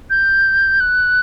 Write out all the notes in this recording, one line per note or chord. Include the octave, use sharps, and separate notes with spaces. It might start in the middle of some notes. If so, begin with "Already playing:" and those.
G6
F#6